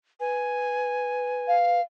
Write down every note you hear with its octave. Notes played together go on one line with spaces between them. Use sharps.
B4 G#5
F5